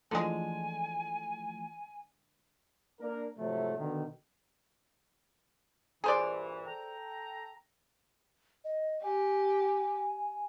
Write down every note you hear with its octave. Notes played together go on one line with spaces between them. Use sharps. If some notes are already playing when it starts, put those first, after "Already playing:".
D3 E3 F3 G#3 A3 G#5
A#3 D4 A#4
G#2 C3 F3 F#3 A3
B2 D3 D#3
G2 A#2 E3 G#4 C5 D5
A4 G5 A#5
D#5
G4 G#5